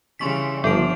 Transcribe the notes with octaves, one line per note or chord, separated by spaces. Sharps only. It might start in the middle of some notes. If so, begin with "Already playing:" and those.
C#3 E3 G3 C6 C#6 B6
G1 F3 B3 A4 D7